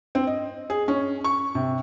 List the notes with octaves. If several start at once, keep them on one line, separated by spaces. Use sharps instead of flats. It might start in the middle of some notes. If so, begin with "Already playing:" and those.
C4
D#5
G#4
C#4
C#6
C3